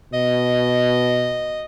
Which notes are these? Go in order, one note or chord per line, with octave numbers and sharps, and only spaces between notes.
B2 D#5